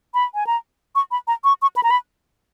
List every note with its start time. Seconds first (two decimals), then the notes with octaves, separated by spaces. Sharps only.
0.14 B5
0.35 G#5
0.47 A#5
0.95 C#6
1.11 B5
1.27 A#5
1.44 C#6
1.62 C#6
1.76 B5
1.83 A#5
1.91 B5